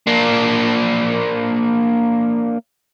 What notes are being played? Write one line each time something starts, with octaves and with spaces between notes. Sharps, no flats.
A#3 D4